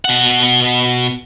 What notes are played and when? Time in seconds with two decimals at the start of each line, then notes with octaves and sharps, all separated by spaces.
0.05 B2 F#5